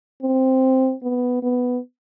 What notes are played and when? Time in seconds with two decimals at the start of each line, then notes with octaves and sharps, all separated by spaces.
0.22 C4
1.03 B3
1.43 B3